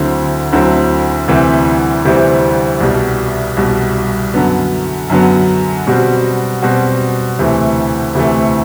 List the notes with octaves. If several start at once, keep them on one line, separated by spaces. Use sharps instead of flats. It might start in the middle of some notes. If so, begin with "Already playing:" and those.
Already playing: D2 D3 F#3 C4 E4
D2 D3 F#3 C4 E4
D2 C3 E3 G3 C4
D2 C3 E3 G3 C4
C2 B2 G3
C2 B2 G3
F#2 D3 F#3 B3
F#2 D3 F#3 B3
B2 G3 C4 F#4
B2 G3 C4 F#4
D2 C3 E3 A3
D2 C3 E3 A3